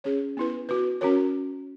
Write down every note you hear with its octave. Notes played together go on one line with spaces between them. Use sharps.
C#4 G#4 C#5
B3 E4 B4
B3 F#4 B4
C#4 F#4 A#4 C#5